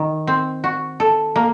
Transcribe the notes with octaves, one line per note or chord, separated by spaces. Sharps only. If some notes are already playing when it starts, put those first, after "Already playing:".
Already playing: D#3
C4
F#4
A4
A#3